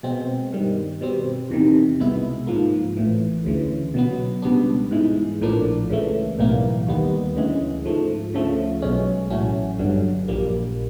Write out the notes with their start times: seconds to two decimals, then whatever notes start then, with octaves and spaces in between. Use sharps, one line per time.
0.03 B2 G#3 C4
0.53 G2 D#3 G3
1.01 B2 G3 C4
1.50 E2 C3 D#3
1.99 C2 B2 G#3 B3 E4
2.47 G#2 F3 A#3
2.97 A1 A2 E3
3.45 D2 C#3 E3
3.94 B2 F#3 B3
4.42 C#2 B2 G3 B3 D4
4.91 G#2 E3 G#3
5.41 A#1 A2 F3 A#3 D4
5.90 C#2 C#3 E3 A3
6.38 B1 A2 E3 G3 A#3
6.87 D#2 D#3 G3 B3
7.35 D2 C#3 E3 G#3
7.85 G#2 F3 A3
8.34 D2 C#3 F3 A3
8.82 B1 B2 G#3 C#4
9.30 A1 A2 F#3 A3 C#4
9.79 G1 G2 D3 F#3
10.28 A#1 A#2 G3 A#3